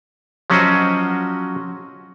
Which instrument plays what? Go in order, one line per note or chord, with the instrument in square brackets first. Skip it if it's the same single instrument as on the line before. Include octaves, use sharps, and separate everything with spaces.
[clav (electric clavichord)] F3 F#3 C#4 F#4 C5 D#5